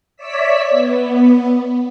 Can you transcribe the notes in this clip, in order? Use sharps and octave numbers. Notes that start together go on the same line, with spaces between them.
C#5 D5 E5 E6 B6
B3